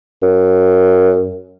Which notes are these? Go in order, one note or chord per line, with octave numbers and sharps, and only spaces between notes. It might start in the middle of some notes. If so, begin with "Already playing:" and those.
F#2